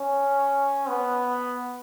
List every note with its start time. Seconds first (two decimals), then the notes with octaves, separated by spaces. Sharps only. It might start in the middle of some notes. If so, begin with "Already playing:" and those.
Already playing: C#4
0.89 B3